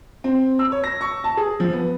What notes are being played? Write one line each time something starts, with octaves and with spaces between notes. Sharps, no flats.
C4
E6
C#5
A#6
C#6
A5
G#4
F3
B3